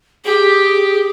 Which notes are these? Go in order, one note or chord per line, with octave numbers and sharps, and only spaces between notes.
G4 G#4